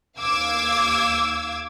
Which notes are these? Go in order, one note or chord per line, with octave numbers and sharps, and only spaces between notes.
D#2 F5 D6 E6 G#6